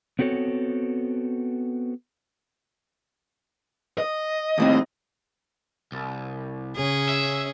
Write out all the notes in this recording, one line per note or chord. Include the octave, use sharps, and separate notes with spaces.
B3 C4 F#4 A4 C#5
D#5
D#2 A2 C4
C2
C#3 C#4 G#4
E5